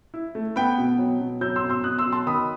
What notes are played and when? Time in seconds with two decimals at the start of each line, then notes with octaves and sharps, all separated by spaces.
0.14 E4
0.35 A3
0.56 B3 G5 B5
0.78 B2
0.98 F#3
1.20 B2
1.41 F#3 E6 G6
1.56 C6 E6
1.63 B2
1.70 C6 E6
1.84 B2 D#6 F#6
1.99 C6 E6
2.06 F#3
2.12 A5 C6
2.26 D#3 B5 D#6